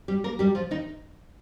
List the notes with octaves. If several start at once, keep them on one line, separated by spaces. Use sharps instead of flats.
G3 G4
A#3 A#4
G3 G4
F3 F4
D#3 D#4